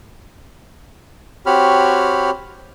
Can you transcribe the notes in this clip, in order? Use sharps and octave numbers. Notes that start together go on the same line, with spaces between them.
C4 F#4 G4 C#5 B5 F6